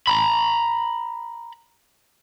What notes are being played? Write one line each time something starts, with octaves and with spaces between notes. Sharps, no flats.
A#5 B5